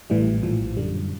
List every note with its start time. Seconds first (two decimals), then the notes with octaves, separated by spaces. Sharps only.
0.10 A1 A2 E3 G3
0.43 A#1 A2 F3
0.76 F#2 D3 G3